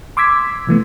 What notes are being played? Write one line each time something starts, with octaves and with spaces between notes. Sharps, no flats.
C6 D6 E6 G#6 B6
C3 E3 A3 B3